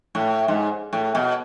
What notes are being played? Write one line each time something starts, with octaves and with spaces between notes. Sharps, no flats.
A2
G#2
A2
B2